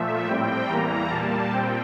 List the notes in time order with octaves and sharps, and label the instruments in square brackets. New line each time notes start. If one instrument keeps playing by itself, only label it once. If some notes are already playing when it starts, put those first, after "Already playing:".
Already playing: [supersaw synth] A#2 F3 A3 E5
A2 G3 C4 G5
E2 E3 G3 A#3 A#5
A#2 G3 A#3 A5
A#2 G3 C4 G5